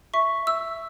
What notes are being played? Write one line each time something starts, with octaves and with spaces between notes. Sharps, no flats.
E5 C#6
E5 E6